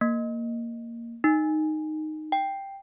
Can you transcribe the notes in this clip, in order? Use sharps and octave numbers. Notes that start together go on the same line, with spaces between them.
A#3
D#4
G5